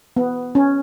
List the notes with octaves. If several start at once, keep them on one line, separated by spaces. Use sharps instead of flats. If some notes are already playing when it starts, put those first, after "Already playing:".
B3
C#4